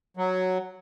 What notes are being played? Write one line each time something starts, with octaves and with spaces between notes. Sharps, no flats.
F#3